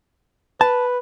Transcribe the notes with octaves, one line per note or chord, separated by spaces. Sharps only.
B4 A5